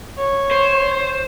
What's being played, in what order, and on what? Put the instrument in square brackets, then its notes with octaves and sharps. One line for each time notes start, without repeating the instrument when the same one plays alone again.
[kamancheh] C#5
[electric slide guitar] C5